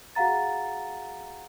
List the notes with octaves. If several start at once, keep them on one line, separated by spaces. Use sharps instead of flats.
F#4 G#4 F5 F#5 A#5 A6